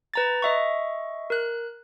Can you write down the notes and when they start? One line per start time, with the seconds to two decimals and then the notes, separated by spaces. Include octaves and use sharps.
0.14 B4 A#5 A6
0.42 D#5 E5 C#6
1.30 A#4 F#6